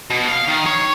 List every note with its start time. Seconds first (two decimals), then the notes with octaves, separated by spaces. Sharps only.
0.10 B2
0.28 F5
0.48 D#3
0.66 C#5